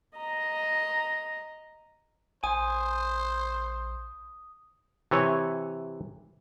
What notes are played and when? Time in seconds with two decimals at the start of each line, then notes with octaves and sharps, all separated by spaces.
0.17 D#5 A#5
2.44 A#1 C5 G#5 D#6
5.11 C3 E3 C#5 G#5